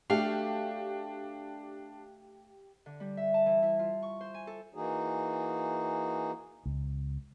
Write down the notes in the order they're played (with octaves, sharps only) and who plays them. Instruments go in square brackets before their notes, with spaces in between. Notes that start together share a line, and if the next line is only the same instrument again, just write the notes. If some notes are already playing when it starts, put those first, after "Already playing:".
[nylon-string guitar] A3 F#4 [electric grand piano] D4 [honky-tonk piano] G4 [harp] F5
[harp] D3
G3
E5
A5
E3
E4
F4
C#6
C5
G#5
A4
[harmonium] E3 A#3 D#4 F#4 G#4
[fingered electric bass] C#2